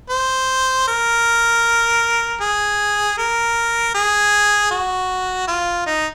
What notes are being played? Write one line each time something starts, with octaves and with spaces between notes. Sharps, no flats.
C5
A#4
G#4
A#4
G#4
F#4
F4
D#4